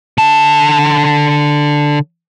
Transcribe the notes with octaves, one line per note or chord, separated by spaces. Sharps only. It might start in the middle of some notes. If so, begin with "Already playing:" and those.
D3 A5